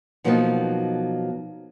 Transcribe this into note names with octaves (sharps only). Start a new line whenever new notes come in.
B2 F3 F#3 A#3 B3 D#4